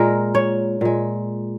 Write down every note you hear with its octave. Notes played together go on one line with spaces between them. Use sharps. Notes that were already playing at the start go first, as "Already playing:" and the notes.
Already playing: A#2 G#3 A#4
C#5
A#2 G#3